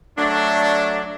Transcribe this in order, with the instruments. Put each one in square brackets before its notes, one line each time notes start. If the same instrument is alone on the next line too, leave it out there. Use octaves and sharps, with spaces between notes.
[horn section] F#3 A3 D4